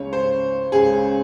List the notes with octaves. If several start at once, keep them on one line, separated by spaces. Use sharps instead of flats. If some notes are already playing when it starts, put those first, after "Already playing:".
Already playing: C#2 C#3 C#5
C5
C#2 C#3 G#4